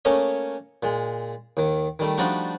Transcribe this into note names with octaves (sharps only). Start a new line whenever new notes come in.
A3 A#3 C#4 C#5 D#5
A#2 G#3
D#2 D#3
D#3 G3 A3
F3 G3 A3 D4 D#4 F#4